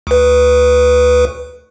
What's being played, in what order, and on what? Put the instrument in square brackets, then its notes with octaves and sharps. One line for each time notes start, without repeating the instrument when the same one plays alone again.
[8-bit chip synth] D2 B4